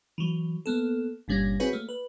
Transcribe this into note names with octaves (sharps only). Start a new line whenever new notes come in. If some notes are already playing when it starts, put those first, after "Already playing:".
E3 F#3
A#3 B3 A4
G1 A#2 G3 C#4 G#6 A#6
C4 E4 F#4 G#4 B4 C#5
A3 A#3
B4